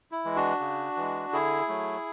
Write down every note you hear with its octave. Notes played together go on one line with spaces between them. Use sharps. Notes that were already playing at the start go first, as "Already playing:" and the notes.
E4
E3 G#3
D4 F#4
C#3
E3 G#3
D3 E4 G#4
F#3 A3